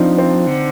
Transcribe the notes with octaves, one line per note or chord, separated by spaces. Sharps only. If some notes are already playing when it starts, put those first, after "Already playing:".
Already playing: F3 C4 D4 D#4
C4
D3